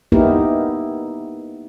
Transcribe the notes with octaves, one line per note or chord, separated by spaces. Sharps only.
A#3 B3 D#4 E4 G4 A#4